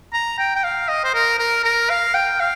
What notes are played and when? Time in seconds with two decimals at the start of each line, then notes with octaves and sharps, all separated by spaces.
0.13 A#5
0.39 G5
0.55 G5
0.64 F5
0.88 D#5
1.04 C5
1.14 A#4
1.39 A#4
1.64 A#4
1.90 F5
2.14 G5
2.40 F5